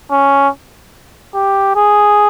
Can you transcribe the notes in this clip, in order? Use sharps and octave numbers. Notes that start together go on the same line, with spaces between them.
C#4
G4
G#4